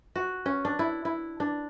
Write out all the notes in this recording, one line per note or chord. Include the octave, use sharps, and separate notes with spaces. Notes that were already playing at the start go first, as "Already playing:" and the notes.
F#4
C#4
D4
E4
E4
D4